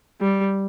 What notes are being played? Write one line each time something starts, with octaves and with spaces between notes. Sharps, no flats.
G3